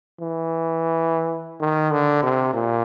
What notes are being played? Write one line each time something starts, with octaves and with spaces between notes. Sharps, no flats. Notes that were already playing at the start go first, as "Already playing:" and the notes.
E3
D#3
D3
C3
A#2